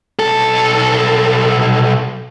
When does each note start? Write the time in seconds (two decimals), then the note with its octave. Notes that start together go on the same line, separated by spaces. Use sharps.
0.19 B1 A4